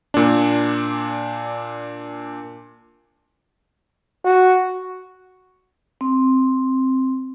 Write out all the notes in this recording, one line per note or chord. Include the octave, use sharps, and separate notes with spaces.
A#2 D4
F#4
C4